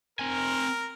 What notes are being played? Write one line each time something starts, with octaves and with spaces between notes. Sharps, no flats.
C4 A#4 G#5